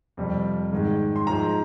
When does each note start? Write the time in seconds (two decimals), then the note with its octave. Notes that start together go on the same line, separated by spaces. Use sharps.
0.17 F2 C3 G3
0.72 G#2 D#3 G#3
1.16 C6
1.27 G#2 F3 G#3 A#5